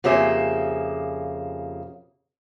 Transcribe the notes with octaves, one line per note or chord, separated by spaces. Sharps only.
F2 C#3 A#3 G4 E5 G#5